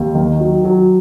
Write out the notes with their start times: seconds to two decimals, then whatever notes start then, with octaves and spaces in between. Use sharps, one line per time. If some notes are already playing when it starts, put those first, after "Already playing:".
Already playing: D#2
0.15 D#3
0.40 F#3
0.65 F#3